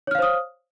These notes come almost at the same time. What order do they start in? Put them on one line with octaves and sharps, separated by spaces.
C#5 F6 F5 C5 D#6